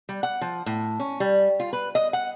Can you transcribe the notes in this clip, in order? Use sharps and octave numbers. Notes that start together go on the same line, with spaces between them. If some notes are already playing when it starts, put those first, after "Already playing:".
G3
F#5
F3
A2
C#4
G3
F4
B4
D#5
F#5